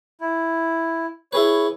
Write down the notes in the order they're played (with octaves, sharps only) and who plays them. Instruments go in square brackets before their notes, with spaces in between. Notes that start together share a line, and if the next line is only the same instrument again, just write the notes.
[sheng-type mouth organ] E4
[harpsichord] E4 G#4 B4 [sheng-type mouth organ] C#5